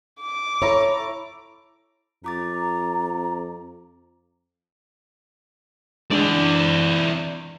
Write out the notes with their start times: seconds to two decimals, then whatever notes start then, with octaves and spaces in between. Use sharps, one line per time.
0.21 D6
0.62 E4 A4 C#5 A#5
2.24 F2 F4 A#5 D6 A6
6.11 E3 G#3 D4 D5